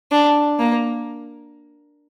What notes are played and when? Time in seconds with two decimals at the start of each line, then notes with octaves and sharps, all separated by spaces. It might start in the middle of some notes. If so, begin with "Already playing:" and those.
0.11 D4
0.59 A#3